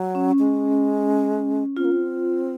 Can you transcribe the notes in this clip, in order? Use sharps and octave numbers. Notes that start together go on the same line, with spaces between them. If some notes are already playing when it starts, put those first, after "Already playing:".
Already playing: F#3
C#4
G#3
C4 F4
A#3
C4